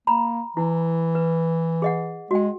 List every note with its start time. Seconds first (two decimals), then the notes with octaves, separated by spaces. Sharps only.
0.07 A#3 A#5 B5
0.57 E3 E4
1.15 B4
1.82 G#4 D#5 F#5
2.31 G#3 F#4 G5